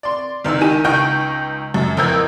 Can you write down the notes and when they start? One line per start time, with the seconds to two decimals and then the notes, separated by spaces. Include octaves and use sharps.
0.03 D5 C6
0.45 G1 C#2 D#3 E6
0.61 D#3 D#4 G4 G#5 D#7
0.84 C#2 D#4 G5 C#6 G6
1.74 F#2
1.97 A1 F2 A#4 E6 G6 G#6